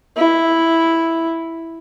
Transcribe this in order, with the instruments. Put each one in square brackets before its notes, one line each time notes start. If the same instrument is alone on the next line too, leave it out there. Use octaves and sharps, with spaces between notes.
[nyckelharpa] E4